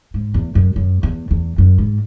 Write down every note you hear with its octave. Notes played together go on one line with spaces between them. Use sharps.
G#2
E2
F#2
F#2
E2
E2
F#2
G#2